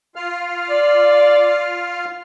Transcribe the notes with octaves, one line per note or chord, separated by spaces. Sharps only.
F4 F5 F6
D5